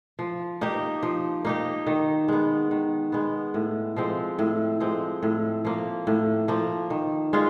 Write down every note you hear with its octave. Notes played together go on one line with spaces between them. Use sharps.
F3
A#3 D#4 G4
F3
A#3 D#4 G4
D#3
G#3 B3
D#3
G#3 B3
A2
F3 G#3 C4
A2
F3 G#3 C4
A2
F3 A#3
A2
F3 A#3
D#3
G#3 C#4 F4